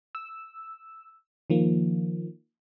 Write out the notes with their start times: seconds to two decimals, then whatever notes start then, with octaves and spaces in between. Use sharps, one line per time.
0.15 E6
1.50 D#3 F3 A#3